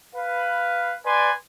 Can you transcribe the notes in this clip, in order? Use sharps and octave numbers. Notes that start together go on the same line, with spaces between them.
B4 F5
B4 D5 G#5 C6